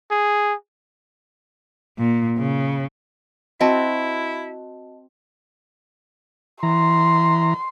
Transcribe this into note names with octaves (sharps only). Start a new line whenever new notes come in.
G#4
A#2
C#3
C4 E4 F#4 D#5 A5
E3 A#5 C6